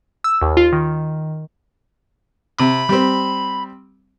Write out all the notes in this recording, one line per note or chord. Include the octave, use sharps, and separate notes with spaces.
E6
D#2
F4
D#3
C3 B5
G3 C4